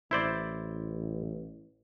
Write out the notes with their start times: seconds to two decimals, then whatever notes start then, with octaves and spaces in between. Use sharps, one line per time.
0.11 A1 E4 C5 D5